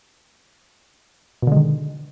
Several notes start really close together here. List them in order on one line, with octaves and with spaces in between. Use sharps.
B2 D3 G#3 D#3